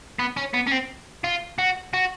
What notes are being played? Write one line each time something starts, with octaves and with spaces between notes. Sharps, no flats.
B3
C#4
B3
C#4
C4
F4
F#4
F#4